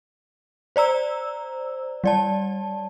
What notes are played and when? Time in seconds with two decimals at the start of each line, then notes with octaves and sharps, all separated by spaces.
0.76 C5 D5 A#5 E6
2.04 G3 D5 A5